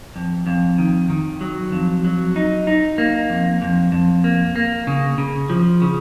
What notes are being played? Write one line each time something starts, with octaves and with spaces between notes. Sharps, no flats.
F2
F2
D#3
D#3
F#3
F2
F#3
D#4
D#4
A#3
F2
F2
F2
A#3
A#3
C#3
C#3
F3
C#3